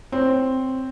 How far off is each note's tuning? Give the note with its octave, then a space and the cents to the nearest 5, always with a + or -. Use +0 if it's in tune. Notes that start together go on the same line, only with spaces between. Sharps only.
C4 +0 C#5 +0